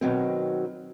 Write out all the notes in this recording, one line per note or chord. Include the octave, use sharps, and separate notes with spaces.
B2 D#3 F#3 C4